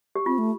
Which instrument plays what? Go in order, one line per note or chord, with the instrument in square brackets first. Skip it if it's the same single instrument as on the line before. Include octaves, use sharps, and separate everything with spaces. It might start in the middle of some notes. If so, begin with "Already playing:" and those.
[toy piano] G4
[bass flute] C4 [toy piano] F4
[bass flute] A3